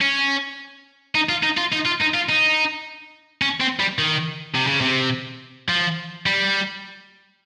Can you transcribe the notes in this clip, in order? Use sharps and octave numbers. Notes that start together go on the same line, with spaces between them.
C#4
D#4
F4
D#4
F4
D#4
F4
D#4
F4
D#4
C#4
C4
G3
D#3
C3
C#3
C3
F3
G3